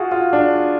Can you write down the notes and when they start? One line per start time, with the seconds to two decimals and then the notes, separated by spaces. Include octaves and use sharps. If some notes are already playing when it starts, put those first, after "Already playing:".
Already playing: F4 F#4 G#4
0.12 F4
0.33 D4